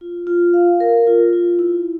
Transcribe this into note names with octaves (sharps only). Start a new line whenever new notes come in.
F4
F4
F5
A#4
F4
F4
E4